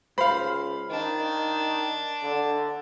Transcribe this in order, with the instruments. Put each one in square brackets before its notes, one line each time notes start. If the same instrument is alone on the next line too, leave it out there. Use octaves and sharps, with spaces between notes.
[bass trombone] C#2 [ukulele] C5 [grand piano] F5 B5
[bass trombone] D#3 [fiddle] D4
[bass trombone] D3